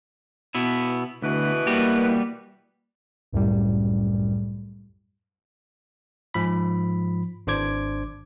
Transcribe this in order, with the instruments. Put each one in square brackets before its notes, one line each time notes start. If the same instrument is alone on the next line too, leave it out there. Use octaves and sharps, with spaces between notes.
[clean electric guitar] B2 B3 E4
[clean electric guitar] D2 [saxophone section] B2 E3 B4
[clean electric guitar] G3 F#4 G4 [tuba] A#3
[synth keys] C2 F#2 A2 G3
[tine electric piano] G#2 F3 B5
G#1 D4 C5 D6 G#6